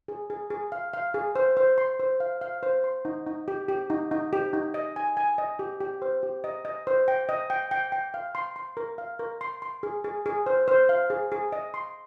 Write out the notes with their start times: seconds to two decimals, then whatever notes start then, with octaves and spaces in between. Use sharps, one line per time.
0.08 G#4
0.30 G#4
0.50 G#4
0.72 F5
0.93 F5
1.14 G#4
1.35 C5
1.57 C5
1.78 C6
2.00 C5
2.20 F5
2.41 F5
2.63 C5
2.84 C6
3.05 D#4
3.27 D#4
3.48 G4
3.69 G4
3.90 D#4
4.11 D#4
4.33 G4
4.53 D#4
4.74 D#5
4.96 G#5
5.17 G#5
5.38 D#5
5.59 G4
5.81 G4
6.02 C5
6.23 G4
6.44 D#5
6.65 D#5
6.87 C5
7.08 G5
7.29 D#5
7.50 G5
7.71 G5
7.92 G5
8.14 F5
8.35 C6
8.56 C6
8.77 A#4
8.98 F5
9.19 A#4
9.41 C6
9.62 C6
9.83 G#4
10.04 G#4
10.26 G#4
10.46 C5
10.68 C5
10.89 F5
11.10 G#4
11.32 G#4
11.52 D#5
11.74 C6